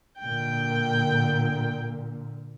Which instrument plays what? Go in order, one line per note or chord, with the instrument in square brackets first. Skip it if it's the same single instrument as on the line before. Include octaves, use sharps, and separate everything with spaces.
[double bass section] A#2 D3 [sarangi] G5